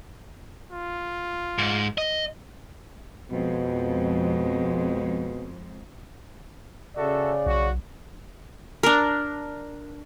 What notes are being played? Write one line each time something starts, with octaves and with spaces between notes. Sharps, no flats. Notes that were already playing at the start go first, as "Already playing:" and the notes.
F4
G#2
D#5
F2 B2 G#3
C#3 F#4 A4 D5 E5
B1 F#4
D4 A#4